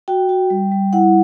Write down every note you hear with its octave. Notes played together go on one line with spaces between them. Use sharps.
F#4 G5
F#4
G3
G3
E4 F#5